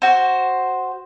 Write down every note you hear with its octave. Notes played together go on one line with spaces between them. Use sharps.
F#4 C5